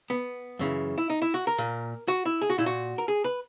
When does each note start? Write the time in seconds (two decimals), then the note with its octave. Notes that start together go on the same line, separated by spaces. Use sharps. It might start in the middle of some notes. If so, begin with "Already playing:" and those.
0.10 B3
0.59 F#2 C#3 E3
0.98 E4
1.10 D#4
1.22 E4
1.34 F#4
1.47 A#4
1.58 A#2
2.08 F#4
2.25 E4
2.42 G#4
2.50 F#4
2.58 A#2 E4
2.66 F#4
2.98 A#4
3.08 G#4
3.24 B4